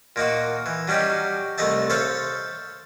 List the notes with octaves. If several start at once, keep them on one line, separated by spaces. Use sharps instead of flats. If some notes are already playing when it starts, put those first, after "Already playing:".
A#2 A#3 D#4 F#4
E3
F#3 G3 C#4 D#4 G4
C2 A3 D#5 E5 A5
A4 C5 C#5 E5 F5 A5